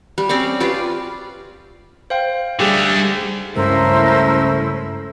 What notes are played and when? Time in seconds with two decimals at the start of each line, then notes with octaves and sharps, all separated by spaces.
0.18 G3
0.29 C4 C#4 G4 D5
0.60 F4 G4 B4 D5
2.10 C5 F5 G5
2.60 D3 G3 A3 G4 G#4
3.56 C#2 G2 A3 C#4 E4 A#4 C5 E6